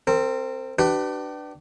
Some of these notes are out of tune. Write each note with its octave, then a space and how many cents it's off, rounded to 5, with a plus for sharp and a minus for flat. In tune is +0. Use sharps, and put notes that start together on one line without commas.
C4 +0 A#4 -35
D4 +15 G4 -40 B4 +10